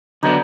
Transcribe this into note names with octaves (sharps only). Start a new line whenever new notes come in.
D3 F#3 B3 D4 D#4